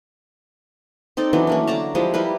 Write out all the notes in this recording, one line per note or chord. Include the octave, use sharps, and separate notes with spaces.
C4 D#4 A4 D5
E3 F#3 B3 D4
A3 A#3 C#4
D3 D5 A5 A#5
F3 G3 G#3 E4
G3 E4 A#4 B4